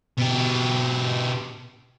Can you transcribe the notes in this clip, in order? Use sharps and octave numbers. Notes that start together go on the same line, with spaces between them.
B2 G4